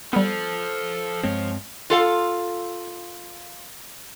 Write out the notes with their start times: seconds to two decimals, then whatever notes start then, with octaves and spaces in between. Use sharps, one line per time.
0.13 F3 G3 B3 A4
1.23 G2 G#3 C4 C#5
1.90 F4 A4 F5